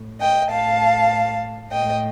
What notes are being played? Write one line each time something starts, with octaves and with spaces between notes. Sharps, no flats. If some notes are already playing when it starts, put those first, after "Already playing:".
Already playing: A2
D#5 G5
A2 F5 A5
A2 D#5 G5